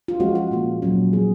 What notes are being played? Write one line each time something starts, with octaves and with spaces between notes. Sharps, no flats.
F4
F3 G#3 C#4 F#4
F#4
A#2 F3 A#3 F4
A#2 F#3 C#4
F3 G#3 B3 F4 G#4